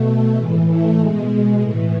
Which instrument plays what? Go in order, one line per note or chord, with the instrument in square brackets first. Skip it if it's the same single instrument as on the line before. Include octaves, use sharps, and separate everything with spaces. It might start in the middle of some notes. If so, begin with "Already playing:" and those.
Already playing: [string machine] B2 A3
A2 E3 G#3
A3
B2 G#3
A2 E3 A3